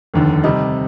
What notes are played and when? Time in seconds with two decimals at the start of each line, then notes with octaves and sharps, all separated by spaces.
0.14 F1 D#2 D3
0.44 C3 G3 C4 D#4